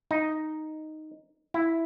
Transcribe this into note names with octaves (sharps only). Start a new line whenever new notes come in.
D#4
E4